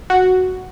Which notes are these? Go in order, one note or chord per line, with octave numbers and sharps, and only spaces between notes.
F#4